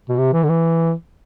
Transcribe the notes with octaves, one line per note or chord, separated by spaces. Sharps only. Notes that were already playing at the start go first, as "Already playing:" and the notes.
B2
C3
E3
D3
E3